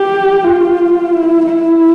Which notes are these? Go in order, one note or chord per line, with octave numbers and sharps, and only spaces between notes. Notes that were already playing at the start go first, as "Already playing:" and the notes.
Already playing: G4
F4
E4
E4